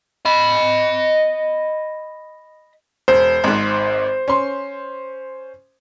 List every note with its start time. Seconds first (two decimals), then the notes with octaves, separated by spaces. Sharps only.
0.25 D#5 B5
3.08 E1 C5 G6
3.44 G#1 G#2
4.28 C#4 C6